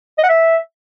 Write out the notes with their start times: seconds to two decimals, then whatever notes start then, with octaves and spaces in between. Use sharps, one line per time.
0.18 D#5
0.24 F#5
0.29 E5